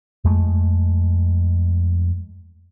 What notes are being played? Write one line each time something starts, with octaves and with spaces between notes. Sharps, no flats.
F2 G#3 A3